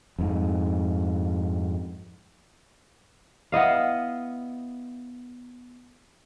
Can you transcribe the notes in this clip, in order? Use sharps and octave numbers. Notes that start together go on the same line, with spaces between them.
F2 G#2
B3 E4 D#5 F5